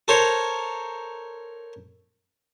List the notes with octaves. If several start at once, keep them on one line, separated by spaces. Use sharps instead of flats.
A4 A#4 C5 C#5